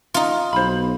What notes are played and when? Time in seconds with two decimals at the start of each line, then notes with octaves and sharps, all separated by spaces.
0.14 D#4 F4
0.53 B1 C5 B5